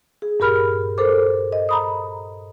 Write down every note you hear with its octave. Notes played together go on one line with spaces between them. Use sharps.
G#4
G2 A#2 G4 A#4 B5 F6
A4 A#4 C5 D6
D#5
A#5 B5 D#6